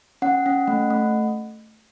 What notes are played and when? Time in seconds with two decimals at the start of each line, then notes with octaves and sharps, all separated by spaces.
0.22 C#4 F#5
0.46 C#4
0.68 A3
0.90 A3